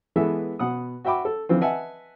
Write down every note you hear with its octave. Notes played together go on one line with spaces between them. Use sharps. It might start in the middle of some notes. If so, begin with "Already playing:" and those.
E3 G#3 B3 A4 E5
B2 F#5 D#6
F#4 E5 G5 B5 D6
A4
D3 E3 F3 C4
B4 D#5 E5 F#5 G#5 A5